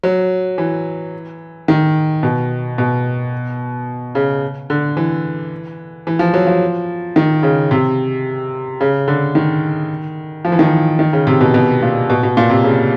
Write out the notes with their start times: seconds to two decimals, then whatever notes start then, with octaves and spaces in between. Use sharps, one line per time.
0.03 F#3
0.58 E3
1.68 D#3
2.23 B2
2.78 B2
4.15 C#3
4.70 D3
4.97 E3
6.07 E3
6.19 F3
6.34 F#3
6.47 F3
7.16 D#3
7.43 C#3
7.71 C3
8.81 C#3
9.08 D3
9.35 D#3
10.45 F3
10.52 E3
10.59 D#3
10.67 E3
10.99 D#3
11.13 C#3
11.27 C3
11.41 B2
11.54 B2
11.82 A#2
12.10 B2
12.23 B2
12.37 A#2
12.50 C3
12.64 C#3